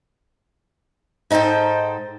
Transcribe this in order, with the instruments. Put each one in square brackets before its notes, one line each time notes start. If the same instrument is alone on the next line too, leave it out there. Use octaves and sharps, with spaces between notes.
[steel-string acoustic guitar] G#2 D#4 A4 C5 G5